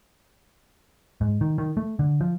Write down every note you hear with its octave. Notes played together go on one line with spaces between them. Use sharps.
G#2
D#3
D#3
A3
D3
F3